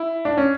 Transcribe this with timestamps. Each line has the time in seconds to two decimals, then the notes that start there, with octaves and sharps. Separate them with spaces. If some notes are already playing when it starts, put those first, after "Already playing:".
Already playing: E4
0.25 D4
0.37 C#4